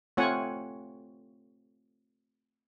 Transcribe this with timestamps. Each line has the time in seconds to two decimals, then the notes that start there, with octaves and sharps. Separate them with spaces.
0.17 A3 C4 F4 C#5 F#5 G#5